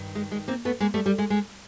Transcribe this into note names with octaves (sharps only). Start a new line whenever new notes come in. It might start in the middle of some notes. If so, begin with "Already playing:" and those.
Already playing: G2 D#3
G#3
G#3
A#3 C4
A3 B3
G#3 A#3
G3 A3
G3
G#3
G#3